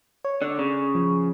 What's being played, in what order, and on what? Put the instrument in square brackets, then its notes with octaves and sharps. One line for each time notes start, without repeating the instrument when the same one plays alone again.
[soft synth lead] C#5
[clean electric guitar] D3 [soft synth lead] D5
[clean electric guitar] C#3
[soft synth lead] F3